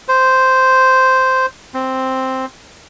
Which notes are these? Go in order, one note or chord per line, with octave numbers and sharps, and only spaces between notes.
C5
C4